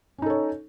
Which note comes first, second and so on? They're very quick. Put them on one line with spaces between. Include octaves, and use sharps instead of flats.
C#4 D#4 A4 C#5